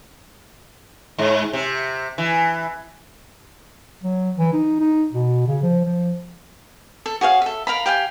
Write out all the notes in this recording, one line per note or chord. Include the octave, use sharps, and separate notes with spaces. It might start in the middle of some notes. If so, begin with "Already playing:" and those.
G#2
C3
E3
F#3
E3
D#4
D#4
B2
C#3
F3
F3
A4
F#4 G#4 C#5 F5
A4 E5
A#4 F5 A#5 B5
G4 F5 G5 G#5